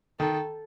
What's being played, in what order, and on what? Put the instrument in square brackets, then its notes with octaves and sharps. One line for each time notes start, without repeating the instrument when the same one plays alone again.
[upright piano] D#3 [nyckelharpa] A4